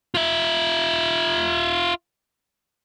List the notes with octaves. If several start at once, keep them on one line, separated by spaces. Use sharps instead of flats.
F4 E5